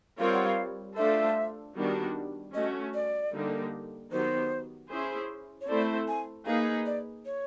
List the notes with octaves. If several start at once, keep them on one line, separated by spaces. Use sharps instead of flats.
G3 C4 F4 A#4 C#5 F5
F#5
F5
A3 D4 F4 A4 C5 E5
D#3 G3 B3 D4 F#4
A3 C#4 F#4 D#5
D5
D3 G3 A#3 D#4
D#3 F#3 B3 D#4 G4 C5
C#4 E4 G#4 C5
C#5
A3 C4 E4 A4 C5 D5
G#5
A#3 D#4 G#4 B4 F5
D5
C#5